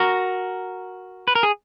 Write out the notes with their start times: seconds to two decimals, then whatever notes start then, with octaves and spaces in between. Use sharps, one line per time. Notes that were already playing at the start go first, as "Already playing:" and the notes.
Already playing: F#4 A#4
1.28 B4
1.35 A#4
1.43 G#4